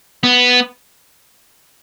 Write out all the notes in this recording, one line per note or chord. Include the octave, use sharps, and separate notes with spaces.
B3